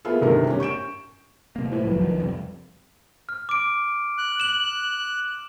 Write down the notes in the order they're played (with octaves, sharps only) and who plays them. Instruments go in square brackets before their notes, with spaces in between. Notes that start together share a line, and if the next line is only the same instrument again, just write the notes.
[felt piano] A#3 B3 E4 F4 G#4 A4
F#1 G2 C3 D#3 A#4
C#4 G4
C#6 G6 D7 E7
[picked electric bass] C3 A#3
[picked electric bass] A2 [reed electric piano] E4 B4 C5
[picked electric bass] G1 C2 F#3 [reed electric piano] F3 B4
[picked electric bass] C#2 D#3
F2 C3 G3
[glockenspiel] F6
D6 D7
[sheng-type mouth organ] F#6
[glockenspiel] E7 F#7